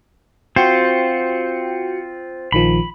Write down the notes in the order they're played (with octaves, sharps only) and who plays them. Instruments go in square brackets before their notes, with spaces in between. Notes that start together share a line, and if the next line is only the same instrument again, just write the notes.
[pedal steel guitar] C4 F4 C5 [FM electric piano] F#4 G5 C#7
[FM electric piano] A#1 D#3 F3 [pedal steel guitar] B5